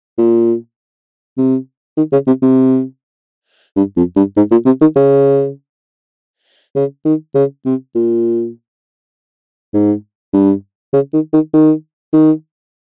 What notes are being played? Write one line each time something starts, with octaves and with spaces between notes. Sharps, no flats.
A#2
C3
D#3
C#3
C3
C3
G2
F2
G2
G#2
A#2
C3
D#3
C#3
C#3
D#3
C#3
C3
A#2
G#2
G2
C#3
D#3
D#3
D#3
D#3